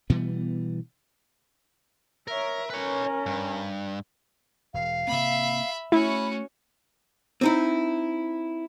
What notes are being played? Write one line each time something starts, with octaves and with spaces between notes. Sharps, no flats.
B2 E3 G3 B3
A#4 C#5 E5
C#4 A#4 B4 C#5
G2
E1 F5
C3 A#3 C4 E5 B5
A3 C#4 E4 F#4 B5
C4 D#4 E4